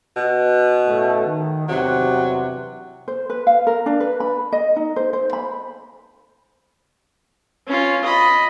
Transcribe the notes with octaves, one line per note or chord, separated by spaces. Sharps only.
B2
A2 C#3 A3
D#3
E2 G2 C3 F#3
C5
B4
F5
A#4
D4
B4
B5
D#5
D#4
C5
C5
B5
C#4 F4
D#5 B5